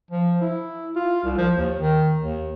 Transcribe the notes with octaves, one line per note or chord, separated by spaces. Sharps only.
F3
E4
F4
C2
F3
D#2
D#3
D#2